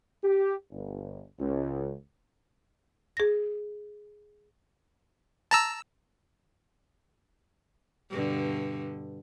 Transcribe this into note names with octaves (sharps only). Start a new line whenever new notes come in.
G4
G1
C#2
G#4 A#6
A5 A#5 E6
G2 B2 D3